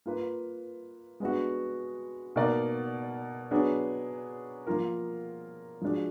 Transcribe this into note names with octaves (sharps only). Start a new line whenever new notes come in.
A#3 F4 B4
G#3 B3 D4 F#4
B2 A#3 D#4 A#4 D5
F#3 B3 D4 G#4
F3 A#3 F4 A#4
F3 G#3 D4 F#4